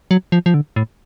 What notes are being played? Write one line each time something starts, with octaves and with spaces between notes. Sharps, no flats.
F#3
F3
F3
D3
A2